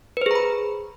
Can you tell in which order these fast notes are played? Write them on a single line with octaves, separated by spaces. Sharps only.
B4 C5 G#4 A#5 B5